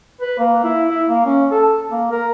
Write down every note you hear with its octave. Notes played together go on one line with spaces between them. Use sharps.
B4
A#3
E4
E4
A#3
C#4
A4
A#3
A#4